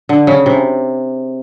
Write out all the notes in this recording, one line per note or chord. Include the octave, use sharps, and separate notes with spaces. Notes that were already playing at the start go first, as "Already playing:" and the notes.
D3
C#3
C3